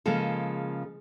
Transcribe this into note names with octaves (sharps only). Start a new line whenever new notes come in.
C#3 F3 G#3 A#3 A4